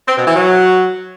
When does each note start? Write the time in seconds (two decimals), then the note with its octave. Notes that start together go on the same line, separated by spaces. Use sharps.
0.08 C4
0.17 B2
0.27 E3
0.36 F#3